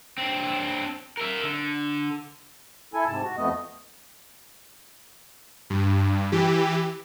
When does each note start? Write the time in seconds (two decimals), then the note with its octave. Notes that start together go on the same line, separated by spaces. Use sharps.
0.18 C4 D4
1.17 A#4 E5
1.43 D3
2.94 E4 A4 G#5
3.08 G#2 C3 A5
3.24 F#4
3.37 F2 A3 B3 D#5
5.70 G2
6.32 E3 G4